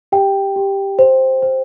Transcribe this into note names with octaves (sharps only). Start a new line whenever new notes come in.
G4 G5
G4
C5
C5